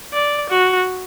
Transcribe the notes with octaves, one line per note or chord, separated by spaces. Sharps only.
D5
F#4